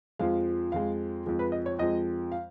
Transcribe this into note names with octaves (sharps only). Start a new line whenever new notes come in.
F2 F3 G#3 F5
F2 F3 G#3 F5
F2 F3 G#3
B4
D#5
C#5
F2 F3 G#3 D#5
F5